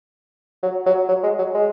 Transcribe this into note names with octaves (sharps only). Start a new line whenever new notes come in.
F#3
F#3
F#3
G#3
F#3
G#3